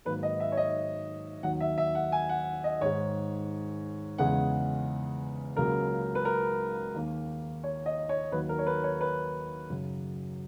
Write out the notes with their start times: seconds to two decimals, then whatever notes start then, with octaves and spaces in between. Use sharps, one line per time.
0.05 G#2 D#3 F#3 A#3 B4
0.23 D#5
0.40 E5
0.52 C#5
0.57 D#5
1.43 D#2 D#3 F#3 F#5
1.60 E5
1.78 E5
1.95 F#5
2.12 G#5
2.29 F#5
2.64 D#5
2.81 G#2 D#3 G#3 C#5
4.18 E2 C#3 G#3 F#5
5.56 C#2 C#3 F#3 A#3 A#4
6.15 B4
6.25 A#4
6.94 D#2 D#3 A#3
7.63 C#5
7.86 D#5
8.09 C#5
8.32 D#2 D#3 F#3 A#3 B4
8.49 A#4
8.59 C#5
8.66 B4
8.84 C#5
9.01 B4
9.70 F#2 C#3 F#3